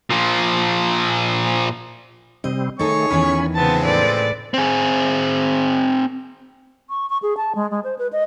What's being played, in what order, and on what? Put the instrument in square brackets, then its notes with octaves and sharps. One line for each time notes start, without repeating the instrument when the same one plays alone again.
[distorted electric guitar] A#2 F3
[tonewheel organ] C3 G3 C4 [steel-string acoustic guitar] D#5
[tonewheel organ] D#3 A3 [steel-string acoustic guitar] D#4 A4 [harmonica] G#4 C#5 C#6
[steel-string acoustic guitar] E2 D#3 E3 [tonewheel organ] C#4 G#5 B5
[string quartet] C#3 B3 A5 [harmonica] F3 G#3 C4 [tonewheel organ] A6
[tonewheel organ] A2 A4 [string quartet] B4 D5
[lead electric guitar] C4 G#4
[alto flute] C#6
C#6
G#4
A5
G#3
G#3
C5
B4
D#5